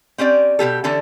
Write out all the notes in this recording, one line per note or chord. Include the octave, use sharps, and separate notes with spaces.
C4 C#4 G4 D5
B2 G#3 G4 A4
D3 E3 C#4 A4 D5